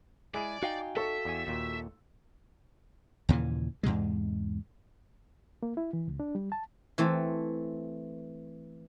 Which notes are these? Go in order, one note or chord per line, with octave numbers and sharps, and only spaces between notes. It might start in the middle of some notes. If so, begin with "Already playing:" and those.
G#3 E4 G#4 D5 G#5
D#4 F#4 F5 G5
A4 E5 C#6
E2 G#5
D#2 A#2
D#2 A#2 C#3 E3
E2 G#2 C3 G#3
A#3
E4
E3
C#2
D4
G3
A5
E3 A3 C4